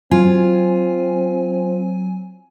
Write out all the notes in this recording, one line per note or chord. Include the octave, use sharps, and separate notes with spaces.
F#3 C4 F4 G#5